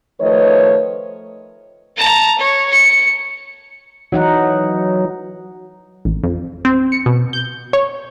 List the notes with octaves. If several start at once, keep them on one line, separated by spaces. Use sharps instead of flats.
D#3 F3 A3 B4 C#5 D#5
A5 A#5
C#5
C#7
E3 F#3 D#4 F#5
A1
F2
C4
C#7
B2
G6
C#5